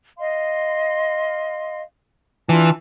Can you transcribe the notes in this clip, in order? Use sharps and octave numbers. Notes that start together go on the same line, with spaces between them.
D#5 F5 C6
E3 D4 F4 A5